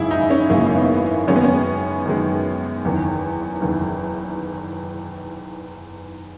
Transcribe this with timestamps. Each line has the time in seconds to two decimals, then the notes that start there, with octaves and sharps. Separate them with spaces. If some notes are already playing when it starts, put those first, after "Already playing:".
Already playing: G#1 F#2 C#3 E3 G#3 E4 G#4
0.11 D#4
0.30 C#4
0.50 G#1 F#2 C#3 E3 G#3 A#3
0.76 B3
1.27 F#2 D#3 G#3 C#4
1.36 B3
1.44 C#4
2.06 F#2 D#3 G#3
2.84 F#1 E2 D#3
3.61 F#1 E2 D#3